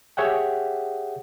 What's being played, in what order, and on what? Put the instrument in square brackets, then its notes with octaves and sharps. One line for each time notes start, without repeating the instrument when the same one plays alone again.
[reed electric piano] G4 G#4 C#5 E5 F#5 G5